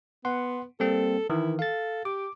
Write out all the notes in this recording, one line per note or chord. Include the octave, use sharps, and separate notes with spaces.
B3 F#5 C6
G3 A#3 C4 A4
D#3 E3 E4
A4 F5 A6
G4 D6